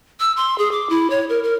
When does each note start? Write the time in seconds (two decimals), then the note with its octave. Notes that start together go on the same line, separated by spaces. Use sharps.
0.20 E6
0.37 C6
0.58 G#4
0.72 D6
0.90 E4
1.10 C#5
1.29 A#4
1.44 A#4